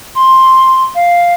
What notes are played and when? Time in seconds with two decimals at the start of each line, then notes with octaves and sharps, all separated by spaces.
0.15 C6
0.95 F5